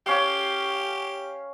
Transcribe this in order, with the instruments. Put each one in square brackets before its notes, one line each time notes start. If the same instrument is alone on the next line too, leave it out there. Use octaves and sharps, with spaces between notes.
[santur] C#4 F5 [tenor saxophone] G4